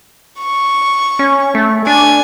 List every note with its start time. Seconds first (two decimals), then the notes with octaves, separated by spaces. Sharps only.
0.39 C#6
1.19 C#4
1.55 A3
1.87 D4 G#5